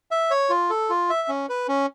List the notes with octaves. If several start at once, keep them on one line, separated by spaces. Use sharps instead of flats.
E5
C#5
F4
A4
F4
E5
C#4
B4
C#4